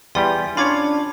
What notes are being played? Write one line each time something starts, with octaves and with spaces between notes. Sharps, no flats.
E2 G3 G4 D5 G#5 C6
C#4 D4 F4 C#5 B5 D6 G#6